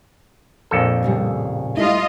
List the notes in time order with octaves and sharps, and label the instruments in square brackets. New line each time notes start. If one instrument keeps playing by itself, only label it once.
[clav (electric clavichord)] A#1 F2 A4
[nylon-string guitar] A2 C#3 G3
[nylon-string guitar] G3 A3 E4 [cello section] F4 D#5